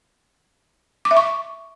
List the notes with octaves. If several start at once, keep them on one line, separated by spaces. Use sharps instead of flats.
D6
E5
C#6